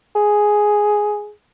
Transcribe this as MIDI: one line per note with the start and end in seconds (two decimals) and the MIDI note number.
0.16 1.31 68